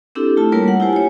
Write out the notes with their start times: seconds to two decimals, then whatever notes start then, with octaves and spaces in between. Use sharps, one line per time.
0.15 C4 D4 E4 G4 A4
0.37 A3 E4 F4 A5
0.52 G3 A#3 F4 A#4 C#5
0.68 F#5
0.80 E4 F4 G4 C5 G#5
0.93 C#5 G#5